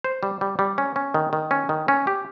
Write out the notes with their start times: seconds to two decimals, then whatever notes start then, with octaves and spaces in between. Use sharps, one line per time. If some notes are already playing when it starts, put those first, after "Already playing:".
0.04 C5
0.23 G3
0.41 G3
0.59 G3
0.78 C#4
0.96 C#4
1.14 D#3
1.33 D#3
1.51 C#4
1.69 D#3
1.88 C#4
2.07 G4